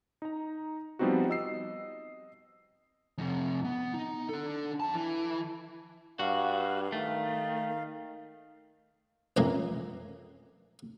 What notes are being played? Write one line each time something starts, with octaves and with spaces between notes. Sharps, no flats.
D#4 A#5
F3 G3 B3 C4 D#4 F#4
D#5 E6 C7
F2 C3
B3
D#4
D4 A4
F2 A5
E3
G2 F#4 F5
D#3 A3
A#1 F2 C#3 E3 G#3 A#3